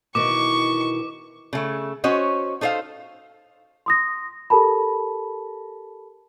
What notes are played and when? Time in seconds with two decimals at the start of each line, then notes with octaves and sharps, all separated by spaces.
0.15 B2 D#3 E3 C#6 D6
1.53 C#3 A3
2.04 C#4 F#4 C5 C#5 D#5
2.61 D#4 A4 C5 D#5 F5
3.86 C6 D#6 A#6
4.50 G4 A4 A#4 A5 B5